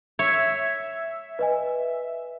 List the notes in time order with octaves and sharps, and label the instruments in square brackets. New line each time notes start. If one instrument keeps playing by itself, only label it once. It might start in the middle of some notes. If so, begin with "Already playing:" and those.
[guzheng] C#5 [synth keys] E5
[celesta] B4 D#5 G#5